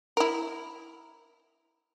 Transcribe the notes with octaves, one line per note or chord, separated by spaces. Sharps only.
E4 A#4